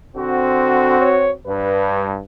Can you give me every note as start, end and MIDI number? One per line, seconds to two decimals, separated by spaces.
0.16 0.97 50
0.16 1.37 60
0.16 1.37 66
1.01 1.30 73
1.46 2.19 43
1.46 2.04 71